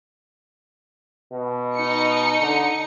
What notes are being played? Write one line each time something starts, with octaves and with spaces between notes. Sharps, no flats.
B2
D#4 C#7
D3